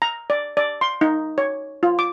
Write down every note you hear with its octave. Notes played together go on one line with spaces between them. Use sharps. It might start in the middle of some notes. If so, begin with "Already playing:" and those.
A#5
D5
D5
C6
D#4
C#5
F4
D6